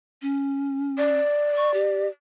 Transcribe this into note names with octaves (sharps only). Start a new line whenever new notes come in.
C#4
D5
C#6
G4